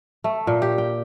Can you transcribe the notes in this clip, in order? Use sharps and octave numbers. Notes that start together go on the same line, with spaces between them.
A3
A#2
G4
G5